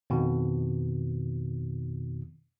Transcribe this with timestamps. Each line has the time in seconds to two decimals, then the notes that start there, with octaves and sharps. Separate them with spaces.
0.10 F2 B2 D#3